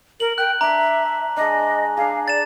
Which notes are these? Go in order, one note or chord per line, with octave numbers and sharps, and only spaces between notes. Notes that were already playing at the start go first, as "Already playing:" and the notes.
A#4 F#7
G5 F#6
D4 E5 A#5
G#3 D4 D#5
D4 G#4 F5
D5 A6 E7